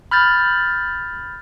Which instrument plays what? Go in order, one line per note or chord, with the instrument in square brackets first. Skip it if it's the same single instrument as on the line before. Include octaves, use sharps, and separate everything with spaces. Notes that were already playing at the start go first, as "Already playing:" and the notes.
[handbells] B5 F6 G6 A6